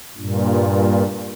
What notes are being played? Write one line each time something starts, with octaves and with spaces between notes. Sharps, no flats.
G2 A#2